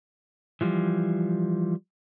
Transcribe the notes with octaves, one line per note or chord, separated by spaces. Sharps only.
E3 F3 G3